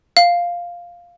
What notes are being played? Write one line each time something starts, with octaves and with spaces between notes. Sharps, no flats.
F5